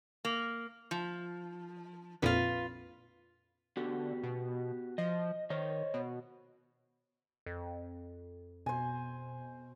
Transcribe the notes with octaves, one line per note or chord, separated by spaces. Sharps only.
A#3
F3
A#1 F2 A#2 F4 B4
D3 B3 F#4 G4
B2
F3 D#5
D#3 C5 C#5 D#5
B2
F2
B2 C5 G#5